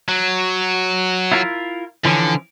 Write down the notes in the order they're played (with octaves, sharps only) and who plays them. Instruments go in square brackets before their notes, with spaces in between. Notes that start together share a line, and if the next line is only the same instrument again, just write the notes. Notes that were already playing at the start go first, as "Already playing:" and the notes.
[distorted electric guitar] F#3
[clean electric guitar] E4 F4 A#4
[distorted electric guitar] D3 [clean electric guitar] E3 F3 C#4